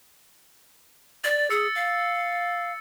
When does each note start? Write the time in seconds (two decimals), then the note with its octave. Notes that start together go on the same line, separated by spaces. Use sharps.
1.24 D5 A6
1.50 G#4 E6 C#7
1.75 F5